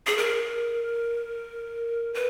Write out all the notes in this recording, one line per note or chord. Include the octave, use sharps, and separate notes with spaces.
G#4
A#4
B4